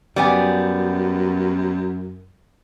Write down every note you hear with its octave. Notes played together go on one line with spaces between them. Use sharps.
F#2 G3 B3 G#5